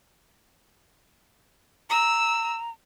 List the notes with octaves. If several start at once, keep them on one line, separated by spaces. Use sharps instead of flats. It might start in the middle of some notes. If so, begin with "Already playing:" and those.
A#5 E6